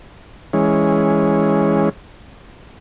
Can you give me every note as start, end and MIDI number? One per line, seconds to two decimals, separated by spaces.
0.53 1.89 52
0.53 1.89 56
0.53 1.89 61